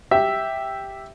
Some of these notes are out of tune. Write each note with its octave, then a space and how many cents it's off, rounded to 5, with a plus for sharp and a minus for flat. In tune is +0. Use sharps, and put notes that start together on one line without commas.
G4 +0 E5 +0